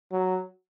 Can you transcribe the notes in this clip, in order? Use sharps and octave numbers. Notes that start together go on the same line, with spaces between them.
F#3